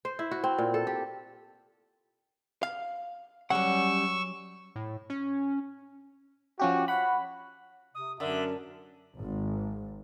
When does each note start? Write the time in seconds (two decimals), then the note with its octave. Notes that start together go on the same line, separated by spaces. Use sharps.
0.05 C5
0.19 E4
0.31 F#4
0.44 C4
0.58 A#2
0.74 A4
0.87 G4
2.63 F5
3.50 F#3 G3 C#4 F#5 C#6 E6
4.76 A2
5.10 C#4
6.59 F3 C#4 F#4 G4
6.88 C#5 F#5 B5
7.94 C3 D#6
8.20 F#2 D3 A#4 E5
9.17 G#1